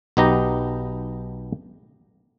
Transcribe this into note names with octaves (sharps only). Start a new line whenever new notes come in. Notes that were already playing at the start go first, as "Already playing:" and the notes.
B1 B3 D#4 G4 A#5